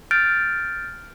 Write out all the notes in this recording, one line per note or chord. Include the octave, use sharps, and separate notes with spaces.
F6 G6 A6 D7